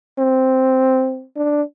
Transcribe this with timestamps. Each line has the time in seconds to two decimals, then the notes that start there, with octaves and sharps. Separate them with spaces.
0.19 C4
1.36 D4